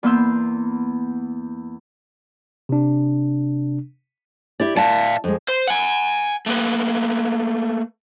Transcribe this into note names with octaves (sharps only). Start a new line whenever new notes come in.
E2 A#3 B3 C6 E6 G6
C3 D4
E4 G4 D5
D5 E5 F5 A5
F2 G#3
C5
F#5 G#5
A3 A#3 B4